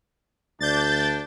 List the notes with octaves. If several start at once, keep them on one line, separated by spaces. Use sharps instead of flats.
D2 D4 G6 A6